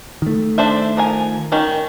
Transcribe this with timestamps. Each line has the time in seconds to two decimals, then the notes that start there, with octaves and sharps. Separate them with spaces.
0.22 D#3 A3
0.58 D4 C5 E5
0.97 F3 A#4 G#5
1.52 D#3 C#4